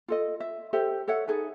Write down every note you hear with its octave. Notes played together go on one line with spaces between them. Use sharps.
F4 A4 D#5
E5
G4 A4 C5 E5
A4 C#5 E5 F#5
D#4 G#4 A4 B4